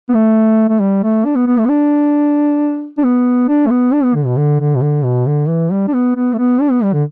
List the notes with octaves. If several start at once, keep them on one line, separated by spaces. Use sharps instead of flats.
B3
A3
A3
G3
A3
D4
B3
B3
A3
B3
D4
D4
B3
D4
A3
B3
D4
B3
D3
B2
D3
D3
B2
D3
B2
D3
E3
G3
D4
B3
B3
A3
B3
D4
B3
G3
D3